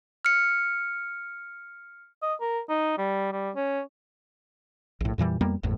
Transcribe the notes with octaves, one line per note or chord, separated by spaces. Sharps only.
F6 C#7
D#5
A#4
D#4
G3
G3
C#4
A#1 A2
F2 A#2 E3 G3
F2 G3 A#3 B3
G1 E2 A2